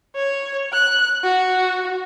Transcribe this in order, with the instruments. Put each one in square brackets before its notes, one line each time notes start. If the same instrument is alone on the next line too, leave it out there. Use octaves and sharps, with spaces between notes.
[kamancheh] C#5
F#6
F#4